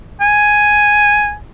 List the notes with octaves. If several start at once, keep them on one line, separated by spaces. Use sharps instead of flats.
G#5